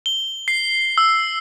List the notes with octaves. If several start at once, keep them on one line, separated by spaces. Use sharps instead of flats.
G7
C7
E6